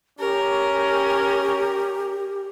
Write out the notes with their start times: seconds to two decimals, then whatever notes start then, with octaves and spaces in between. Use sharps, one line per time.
0.20 C#4 G4 A#4